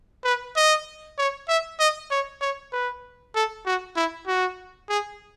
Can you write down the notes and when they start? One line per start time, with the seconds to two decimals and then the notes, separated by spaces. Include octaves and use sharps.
0.24 B4
0.56 D#5
1.18 C#5
1.48 E5
1.79 D#5
2.11 C#5
2.41 C#5
2.72 B4
3.35 A4
3.65 F#4
3.96 E4
4.27 F#4
4.89 G#4